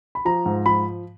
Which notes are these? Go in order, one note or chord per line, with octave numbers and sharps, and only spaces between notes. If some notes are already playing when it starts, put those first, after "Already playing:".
B5
F3 A#5
G#2
F3 B5